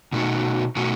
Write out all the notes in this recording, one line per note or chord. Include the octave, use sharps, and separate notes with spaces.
B2 A3 D#4 F#4
B2 A3 D#4 F#4